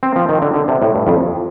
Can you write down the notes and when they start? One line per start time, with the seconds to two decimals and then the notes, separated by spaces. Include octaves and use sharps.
0.03 C4
0.16 F3
0.29 D#3
0.42 D3
0.54 D3
0.68 C3
0.82 A2
0.95 G2
1.07 F2